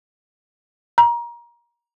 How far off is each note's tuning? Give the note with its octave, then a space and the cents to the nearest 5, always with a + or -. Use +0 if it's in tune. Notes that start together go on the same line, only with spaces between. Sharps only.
A#5 +25